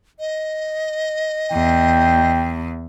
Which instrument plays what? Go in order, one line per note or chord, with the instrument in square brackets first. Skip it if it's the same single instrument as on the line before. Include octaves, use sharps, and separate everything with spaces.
[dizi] D#5
[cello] E2 [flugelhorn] G5